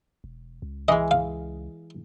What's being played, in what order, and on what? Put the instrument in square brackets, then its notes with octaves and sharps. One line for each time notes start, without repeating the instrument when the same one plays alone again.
[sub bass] E1
C#2
[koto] E3 G#3 [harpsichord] D#5
[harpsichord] F5